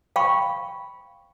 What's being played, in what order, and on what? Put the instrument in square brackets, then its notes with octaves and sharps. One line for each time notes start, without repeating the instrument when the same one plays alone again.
[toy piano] F5 G5 B5 C#6